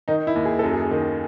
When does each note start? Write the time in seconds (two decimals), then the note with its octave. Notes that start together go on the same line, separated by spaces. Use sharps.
0.08 D#3 D#4
0.27 E4
0.36 D#2
0.45 G#4
0.59 F#2 A4
0.73 G#4
0.91 D#3